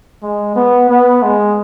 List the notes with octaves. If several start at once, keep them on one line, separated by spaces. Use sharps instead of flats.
G#3
B3
B3
G#3